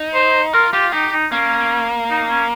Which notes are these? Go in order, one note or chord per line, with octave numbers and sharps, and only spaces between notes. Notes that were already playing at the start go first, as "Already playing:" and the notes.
Already playing: D#4
C5
F4 A#4
F4 G4
D#4 G4
D#4
A#3 C#4
D#4
C#4